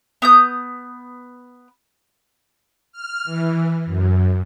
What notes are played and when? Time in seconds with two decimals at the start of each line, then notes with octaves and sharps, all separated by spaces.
0.22 B3 D#6 G6
2.92 F6
3.25 E3
3.86 F#2